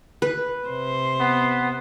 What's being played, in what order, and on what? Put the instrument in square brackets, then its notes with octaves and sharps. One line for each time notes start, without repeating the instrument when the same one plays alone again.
[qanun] B4
[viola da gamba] C3 C5
[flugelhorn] B3